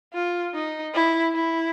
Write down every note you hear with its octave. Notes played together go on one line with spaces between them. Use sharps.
F4
D#4
E4
E4